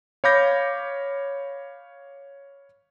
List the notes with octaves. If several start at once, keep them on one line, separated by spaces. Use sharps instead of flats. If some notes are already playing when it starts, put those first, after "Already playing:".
C#5 F5 B5 D6 G6 A#6